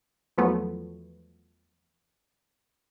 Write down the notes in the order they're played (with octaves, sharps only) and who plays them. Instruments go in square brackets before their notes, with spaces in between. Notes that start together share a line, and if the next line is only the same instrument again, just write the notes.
[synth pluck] E2 F3 F#3 A3 B3